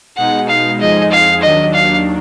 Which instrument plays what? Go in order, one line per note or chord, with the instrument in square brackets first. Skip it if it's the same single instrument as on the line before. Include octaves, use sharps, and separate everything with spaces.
[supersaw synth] B2 G#3 D#4 [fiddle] F#5
[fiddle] F5
[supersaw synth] F2 F3 G#3 D#4 G#4 [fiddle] D#5
[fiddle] F5
[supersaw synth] D#2 D#3 F#3 D4 [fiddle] D#5
[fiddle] F5